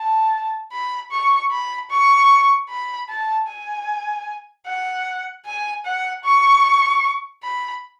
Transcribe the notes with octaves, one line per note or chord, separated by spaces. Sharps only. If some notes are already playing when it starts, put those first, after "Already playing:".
Already playing: A5
B5
C#6
B5
C#6
B5
A5
G#5
F#5
G#5
F#5
C#6
B5